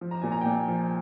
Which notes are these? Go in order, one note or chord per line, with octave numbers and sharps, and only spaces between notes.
F3
A#5
A#2 G#5
A#5
G5
A#2 G#5
F3